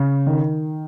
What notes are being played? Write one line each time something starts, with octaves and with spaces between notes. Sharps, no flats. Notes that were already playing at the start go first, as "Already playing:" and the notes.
Already playing: C#3
D#3